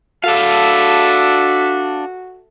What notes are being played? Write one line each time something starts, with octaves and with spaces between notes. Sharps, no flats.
D4 F#4 A4 E5 F5